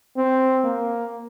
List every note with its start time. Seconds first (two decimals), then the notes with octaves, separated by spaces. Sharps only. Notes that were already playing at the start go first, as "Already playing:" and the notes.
0.16 C4
0.64 A#3